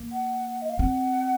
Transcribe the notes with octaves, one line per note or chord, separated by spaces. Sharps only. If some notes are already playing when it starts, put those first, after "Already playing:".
Already playing: A#3
F#5
D#5
F5
C4 F#5